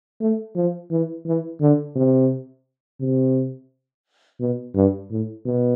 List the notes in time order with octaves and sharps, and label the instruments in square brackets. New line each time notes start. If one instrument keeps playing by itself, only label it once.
[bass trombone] A3
F3
E3
E3
D3
C3
C3
B2
G2
A2
B2